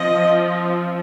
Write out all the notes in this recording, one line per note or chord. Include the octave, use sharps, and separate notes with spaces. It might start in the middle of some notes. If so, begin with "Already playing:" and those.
Already playing: F3 C4 D#5